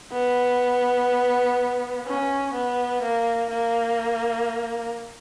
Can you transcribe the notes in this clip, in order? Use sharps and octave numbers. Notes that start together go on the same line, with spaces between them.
B3
C#4
B3
A#3
A#3